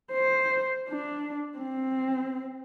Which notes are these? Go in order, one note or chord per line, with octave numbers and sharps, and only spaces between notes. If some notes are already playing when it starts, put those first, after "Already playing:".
C5
D4
C4